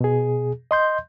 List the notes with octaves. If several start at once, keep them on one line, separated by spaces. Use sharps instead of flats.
B2 G#4
D#5 C6 G6